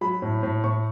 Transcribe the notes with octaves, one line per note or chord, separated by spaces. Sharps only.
F#3 B5
A2
A2
A2 C#6